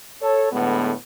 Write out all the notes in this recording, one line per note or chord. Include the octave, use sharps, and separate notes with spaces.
A4 C#5
A2 D3 G#3 B3